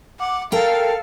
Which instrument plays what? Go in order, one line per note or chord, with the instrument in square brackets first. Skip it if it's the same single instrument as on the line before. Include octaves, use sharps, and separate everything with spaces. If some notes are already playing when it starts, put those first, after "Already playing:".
[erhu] F#5 [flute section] D6
[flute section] A4 [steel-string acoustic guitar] A#4 G5 [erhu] F5